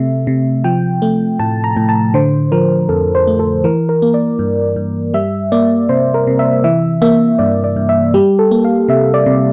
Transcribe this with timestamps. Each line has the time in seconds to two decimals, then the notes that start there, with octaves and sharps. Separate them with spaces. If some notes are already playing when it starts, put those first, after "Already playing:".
Already playing: C3 A3 E5
0.27 C3
0.64 F3 G5
1.02 A3
1.39 A2 A5
1.64 A#5
1.76 A2
1.89 A5
2.14 D3 C5
2.52 F3 A#4
2.89 F2 A4
3.15 C5
3.27 A3
3.39 A4
3.64 E3 A#4
3.89 A#4
4.02 A#3
4.14 D5
4.39 G2
4.76 G2
5.14 G3 E5
5.52 A#3 D5
5.89 C3 C5
6.14 A#4
6.27 C3
6.39 E5
6.64 E3 E5
7.02 A#3 E5
7.39 G2 D5
7.64 D5
7.76 G2
7.89 E5
8.14 G3 G4
8.39 A4
8.51 A#3
8.64 F5
8.88 C3 E5
9.14 D5
9.26 C3